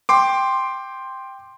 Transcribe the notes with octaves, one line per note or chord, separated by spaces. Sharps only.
G5 C6 D6